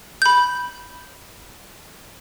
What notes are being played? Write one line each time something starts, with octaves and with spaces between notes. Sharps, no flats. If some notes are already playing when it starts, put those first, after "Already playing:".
B5 G6